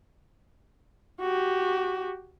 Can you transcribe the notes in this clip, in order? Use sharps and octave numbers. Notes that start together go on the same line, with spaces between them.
F#4 G4